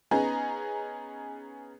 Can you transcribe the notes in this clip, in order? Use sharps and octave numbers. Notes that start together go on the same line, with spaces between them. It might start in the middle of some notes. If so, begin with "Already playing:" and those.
B3 C#4 D#4 G#4 A#5